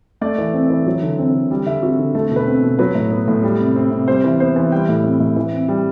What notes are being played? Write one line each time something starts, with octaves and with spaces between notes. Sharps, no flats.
A3 D5
E3
C4
E3
F#3
D3
C4
D3
G3
D3 E5
C4 F#4
D3
A3 A4
B2
B4
C4
B2
F#3 B4
A2
B3
A2
G3
C3
C4
C3
G3 C5
E3
B3 C5
E3
G3 G5
A2
C4
A2
E3
C4
G3